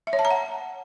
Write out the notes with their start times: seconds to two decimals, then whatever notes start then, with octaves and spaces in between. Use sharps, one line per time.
0.07 E5
0.13 C#5
0.19 A5
0.25 A#5
0.31 F#5